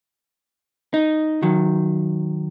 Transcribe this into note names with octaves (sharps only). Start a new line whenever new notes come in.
D#4
D#3 F#3